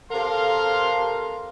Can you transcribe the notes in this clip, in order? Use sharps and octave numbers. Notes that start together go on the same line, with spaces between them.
C3 A4 A#4 F5 C6